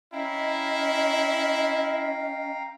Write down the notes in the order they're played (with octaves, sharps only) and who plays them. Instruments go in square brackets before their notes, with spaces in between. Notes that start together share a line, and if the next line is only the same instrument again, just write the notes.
[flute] C#4 [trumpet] E4 [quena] D#5 [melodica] F5 G5 A#5